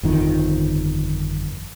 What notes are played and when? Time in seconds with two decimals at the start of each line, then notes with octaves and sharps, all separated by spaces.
0.03 G1 F2 D#3 F3